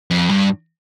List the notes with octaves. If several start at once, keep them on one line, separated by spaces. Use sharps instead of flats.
F2
G2